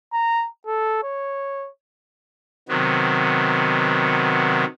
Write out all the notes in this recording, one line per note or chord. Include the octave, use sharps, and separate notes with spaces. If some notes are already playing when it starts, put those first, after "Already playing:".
A#5
A4
C#5
C3 D#3 F#3 B3